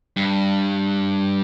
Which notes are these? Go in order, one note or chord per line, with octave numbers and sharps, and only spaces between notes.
G2